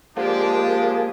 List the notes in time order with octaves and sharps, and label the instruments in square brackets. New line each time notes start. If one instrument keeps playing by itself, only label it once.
[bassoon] F3 [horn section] G#3 D4 [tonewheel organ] A#3 G#4 [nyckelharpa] G4